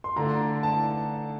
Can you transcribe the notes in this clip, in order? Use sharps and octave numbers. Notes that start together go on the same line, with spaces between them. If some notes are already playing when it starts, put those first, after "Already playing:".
C6
D3 A3 D4 F4 A#5
A5